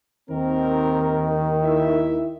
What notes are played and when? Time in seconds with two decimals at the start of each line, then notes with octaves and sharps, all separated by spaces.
0.30 D#2 D#3 C4 A#4
1.63 E4 E5